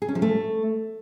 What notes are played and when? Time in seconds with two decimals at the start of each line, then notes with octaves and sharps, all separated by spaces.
0.02 G#4
0.08 C#4
0.15 F3
0.22 A3